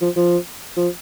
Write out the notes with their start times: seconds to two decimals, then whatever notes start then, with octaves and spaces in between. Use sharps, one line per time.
0.01 F3
0.16 F3
0.77 F3